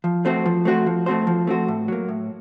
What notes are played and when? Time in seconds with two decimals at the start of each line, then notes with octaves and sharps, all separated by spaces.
0.04 F3
0.25 A3 C4 F#4 C5
0.46 F3
0.65 A3 C4 F#4 C5
0.86 F3
1.06 A3 C4 F#4 C5
1.27 F3
1.47 A3 C4 F#4 C5
1.68 A2
1.88 F#3 A#3
2.08 A2